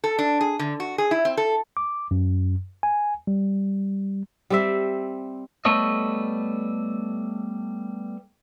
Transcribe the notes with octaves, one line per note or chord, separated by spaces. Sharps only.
A4
D4
G#4
D3
F#4
G#4
E4
C4
A4
D6
F#2
G#5
G3
G3 C4 E5
G3 A3 B3 A4 C#5 D#5